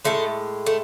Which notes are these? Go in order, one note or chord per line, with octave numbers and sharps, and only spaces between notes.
A2 G#3 A3
A3